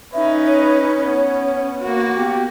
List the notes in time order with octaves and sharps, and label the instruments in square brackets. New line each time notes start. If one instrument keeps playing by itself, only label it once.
[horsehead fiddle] C#4 D#4 [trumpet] B4 [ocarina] E5
[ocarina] C#5
[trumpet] B3 [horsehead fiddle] C#4
[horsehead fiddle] A#3 F#4
[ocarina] B3 [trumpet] G4